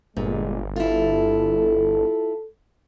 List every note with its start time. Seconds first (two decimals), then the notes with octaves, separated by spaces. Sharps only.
0.17 G1 A#2 G#3
0.76 E4 F4 A4